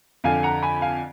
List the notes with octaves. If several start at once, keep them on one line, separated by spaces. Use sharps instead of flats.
F2 D3 F5 G#5
F#5 A#5
G#5 B5
F5 G#5